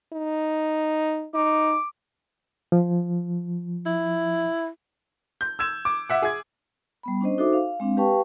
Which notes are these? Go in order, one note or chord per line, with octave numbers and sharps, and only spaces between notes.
D#4
D#4 D6
F3
E4
G6
E6 G#6 E7
D6
E5 F#5
G#4 G#6
G3 B3 B5
C#4 D4 C5 D#5
D#4 F#4 A4 C5 E5 D6
F5
G#3 C4 D4 F5
G4 B4 F5 G5 A5 C#6